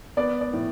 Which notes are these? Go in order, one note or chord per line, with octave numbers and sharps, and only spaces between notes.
B3 D5
D5
A2